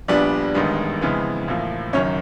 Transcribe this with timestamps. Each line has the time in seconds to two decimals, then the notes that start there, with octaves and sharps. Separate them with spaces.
0.08 A#1 A#2 G3 B3 D4 D5
0.54 A1 G2 D#3 G#3 B3
1.01 F2 C#3 E3 G#3 B3
1.48 A1 A2 F3 A#3
1.93 F#1 F#2 D#3 C#4 C#5